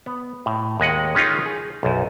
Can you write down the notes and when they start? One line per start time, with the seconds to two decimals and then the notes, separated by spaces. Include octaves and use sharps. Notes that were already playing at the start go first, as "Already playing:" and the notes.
0.06 B3
0.46 A2
0.80 D#2 G#3 D#5 F#5
1.15 G#3 C#4 D#4 F4
1.46 G#4
1.83 B1 F#2